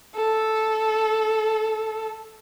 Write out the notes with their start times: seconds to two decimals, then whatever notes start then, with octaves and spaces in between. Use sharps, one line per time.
0.15 A4